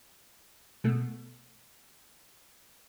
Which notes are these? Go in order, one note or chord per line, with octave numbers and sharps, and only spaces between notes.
B2 A3